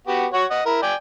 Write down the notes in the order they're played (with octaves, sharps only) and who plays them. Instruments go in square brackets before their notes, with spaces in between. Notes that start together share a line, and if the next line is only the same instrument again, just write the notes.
[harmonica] B3 F#4 G4
F#4 C#5 F#5
D#5 F#5
E4 A#4
D5 G5 G#5